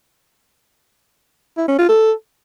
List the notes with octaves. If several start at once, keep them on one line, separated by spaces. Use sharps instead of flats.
E4
C#4
F4
A4